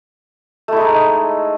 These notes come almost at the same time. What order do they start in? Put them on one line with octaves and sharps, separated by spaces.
A3 E4 G#3 D#4